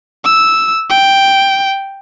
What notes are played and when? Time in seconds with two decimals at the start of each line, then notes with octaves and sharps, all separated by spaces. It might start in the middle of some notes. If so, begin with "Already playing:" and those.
0.25 E6
0.90 G5